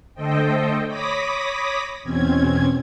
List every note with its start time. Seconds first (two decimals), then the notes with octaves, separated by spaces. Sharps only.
0.14 D3 A3 A4 C5 D#5 G5
0.87 C#5 B5 D6 D#6 A#6 B6
2.03 E2 B2 C4 C#4 G#6